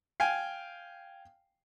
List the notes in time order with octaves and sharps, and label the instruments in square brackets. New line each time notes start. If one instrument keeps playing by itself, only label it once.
[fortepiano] F5 G5 G#5